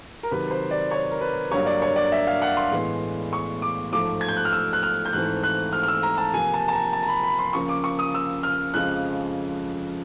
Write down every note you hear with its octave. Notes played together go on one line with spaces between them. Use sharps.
A#4
C3 D#3 F#3 B4
C5
D5
C#5
A#4
B4
G2 D3 F#3 A#3 C#5
D5
C#5
D5
E5
F5
F#5
C6
A2 E3 G#3 B3
C#6
D6
G#2 F3 A3 D6
G#6
G6
F#6
F6
E6
F#6
F6
G6
G#2 E3 A3 C4 F#6
F#6
F6
F6
E6
A#5
A5
C3 F3 A#3 G#5
A5
A5
A#5
A5
A#5
B5
B5
C6
C#3 F3 A#3 C#6
D6
C#6
D#6
E6
F6
F2 C#3 F3 G#3 C4 F#6